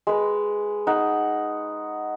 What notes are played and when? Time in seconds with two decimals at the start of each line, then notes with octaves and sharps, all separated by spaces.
0.07 G#3 B4
0.87 D#4 F#5